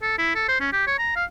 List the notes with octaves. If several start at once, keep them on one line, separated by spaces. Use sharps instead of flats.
A4
E4
A4
C5
C#4
G4
C#5
A#5
F5